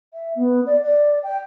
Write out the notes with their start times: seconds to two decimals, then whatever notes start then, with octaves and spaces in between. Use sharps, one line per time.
0.13 E5
0.35 B3
0.66 D5
0.83 D5
1.23 G5